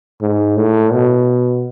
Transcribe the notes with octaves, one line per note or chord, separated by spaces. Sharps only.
G#2
A2
B2